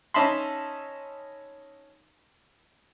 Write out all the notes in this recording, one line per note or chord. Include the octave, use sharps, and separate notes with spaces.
C#4 D#4 E5 A5 B5 C6